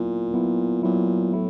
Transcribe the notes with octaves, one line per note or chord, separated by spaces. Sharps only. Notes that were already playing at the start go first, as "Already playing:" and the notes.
Already playing: A#2 F#3 B3 E4
F#3 B3 E4
A#2 F#3 B3 E4
A2 E4